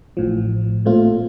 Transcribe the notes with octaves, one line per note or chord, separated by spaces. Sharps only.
A1 A2 F3
A#2 A3 C4 F4